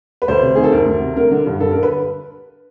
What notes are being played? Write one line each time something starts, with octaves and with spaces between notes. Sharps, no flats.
B4
D2 C5
C3
D#3 G#4
A4
D2 A#4
D2
C3
D3 A#4
D3
G2
G2 A4
D3 A#4
B4